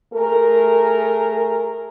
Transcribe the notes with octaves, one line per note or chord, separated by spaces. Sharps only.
A3 G#4 A#4